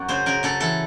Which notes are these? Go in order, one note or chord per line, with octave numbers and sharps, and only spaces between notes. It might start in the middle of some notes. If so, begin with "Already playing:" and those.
Already playing: F#2 F#4
C#3 C5
C#3 A#4
C#3 A4
E3 A4